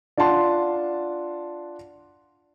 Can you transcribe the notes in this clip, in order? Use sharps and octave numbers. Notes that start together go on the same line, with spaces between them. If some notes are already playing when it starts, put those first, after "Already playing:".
D4 F4 F#5 A5 C6